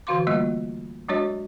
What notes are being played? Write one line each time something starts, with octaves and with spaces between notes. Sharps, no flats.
D3 E3 F#4 F5 C6 D6
G3 A3 A#3 F4 D#5
F#3 G#3 D4 F#4 C#5 D#5